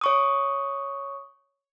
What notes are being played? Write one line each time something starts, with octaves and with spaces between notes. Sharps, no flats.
C#5 C#6 D#6